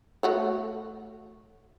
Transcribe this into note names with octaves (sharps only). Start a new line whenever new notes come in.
A3 F#4 C#5